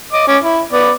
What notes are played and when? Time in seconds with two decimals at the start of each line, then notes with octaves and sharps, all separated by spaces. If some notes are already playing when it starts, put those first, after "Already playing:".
0.13 D#5 D6
0.28 C#4 D6
0.43 E4
0.72 B3 D5